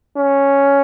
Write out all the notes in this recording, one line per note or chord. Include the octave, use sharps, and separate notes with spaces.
C#4